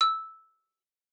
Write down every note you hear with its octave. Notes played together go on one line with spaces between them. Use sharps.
E6